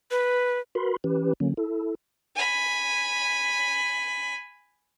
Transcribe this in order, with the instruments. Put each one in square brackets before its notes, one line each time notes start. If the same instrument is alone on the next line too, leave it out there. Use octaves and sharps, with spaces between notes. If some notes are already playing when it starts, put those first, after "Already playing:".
[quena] B4
[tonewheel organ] F#4 A#4 B4 B5 C6
E3 C#4 G4 B4
D3 F#3 A#3 C#4
E4 A4
[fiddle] G#5 B5